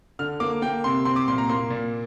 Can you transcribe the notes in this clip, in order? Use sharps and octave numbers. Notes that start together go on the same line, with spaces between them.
D3 F6
A#3 D6
A#3 G5
C3 C6
C4 C6
D6
A#2 C6
A#5
A#3 C6
A#2